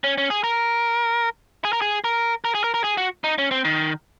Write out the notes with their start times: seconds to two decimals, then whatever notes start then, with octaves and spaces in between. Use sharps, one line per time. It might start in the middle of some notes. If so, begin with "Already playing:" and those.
0.04 C#4
0.18 C#4
0.30 G#4
0.44 A#4
1.64 G#4
1.73 A#4
1.82 G#4
2.04 A#4
2.45 A#4
2.55 G#4
2.64 A#4
2.74 A#4
2.84 G#4
2.97 F#4
3.24 D#4
3.38 C#4
3.51 C4
3.65 D#3